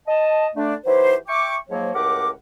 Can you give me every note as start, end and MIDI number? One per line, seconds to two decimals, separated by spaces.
0.07 0.47 75
0.07 0.47 81
0.56 0.74 50
0.56 0.74 57
0.56 0.74 62
0.85 1.15 52
0.85 1.15 54
0.85 1.15 63
0.85 1.15 64
0.85 1.15 67
0.85 1.15 72
1.28 1.57 76
1.28 1.57 79
1.28 1.57 85
1.28 1.57 86
1.70 1.91 44
1.70 1.91 53
1.70 1.91 54
1.70 1.91 58
1.70 1.91 73
1.94 2.30 37
1.94 2.30 45
1.94 2.30 67
1.94 2.30 70
1.94 2.30 78
1.94 2.30 86